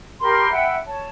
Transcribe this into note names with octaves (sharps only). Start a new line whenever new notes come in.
G4 A#4 B5 C6
E5 F#5 G5 B5
C#5 A5